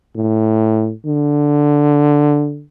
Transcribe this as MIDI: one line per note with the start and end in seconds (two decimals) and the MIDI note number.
0.16 0.92 45
1.06 2.63 50